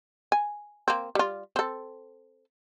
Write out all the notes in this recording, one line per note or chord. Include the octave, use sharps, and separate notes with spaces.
G#5
A#3 C4
G3 F4
C4 A4